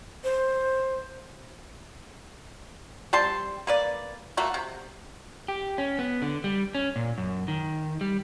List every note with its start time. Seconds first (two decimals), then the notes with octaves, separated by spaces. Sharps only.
0.24 C5
3.13 G3 C4 A5 C6
3.67 A#3 B4 D5
4.37 A3 A#3 F#4
4.54 C3
5.48 G4
5.78 C#4
5.99 B3
6.22 D3
6.44 G3
6.75 C#4
6.96 A#2
7.18 F#2
7.48 D#3
8.01 G3